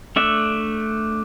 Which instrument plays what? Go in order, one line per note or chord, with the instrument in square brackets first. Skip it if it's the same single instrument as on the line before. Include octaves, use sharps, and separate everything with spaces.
[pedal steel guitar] A3 D4 E5